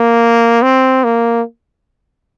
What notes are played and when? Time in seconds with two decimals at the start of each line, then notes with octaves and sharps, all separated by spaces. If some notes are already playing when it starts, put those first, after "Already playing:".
Already playing: A#3
0.62 C4
1.04 A#3